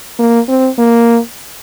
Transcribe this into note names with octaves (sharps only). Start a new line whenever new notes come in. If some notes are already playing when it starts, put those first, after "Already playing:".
A#3
C4
A#3